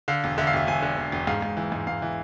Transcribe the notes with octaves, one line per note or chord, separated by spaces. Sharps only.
D3 F5
E1
D3 E5
F5
E1 E5
E1 G#5
D3
E1
E1
G#2 F5
G#2
E3
G#2
G#2 F5
E3